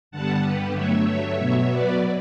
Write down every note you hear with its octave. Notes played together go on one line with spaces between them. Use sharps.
G2 D3 G3 B3 F#5 A5
G4 B4
G2 F#3 A3 C#5 E5
C#5 E5
B2 F#3 B3 C#5 E5
B4 D5